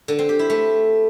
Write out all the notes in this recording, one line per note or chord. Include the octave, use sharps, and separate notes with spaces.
D3
C4
G4
E4
A3